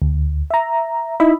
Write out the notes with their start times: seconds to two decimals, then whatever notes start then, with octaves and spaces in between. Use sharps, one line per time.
0.02 D2
0.50 E5 A#5
1.20 D#4 E4 D#5 E5 B5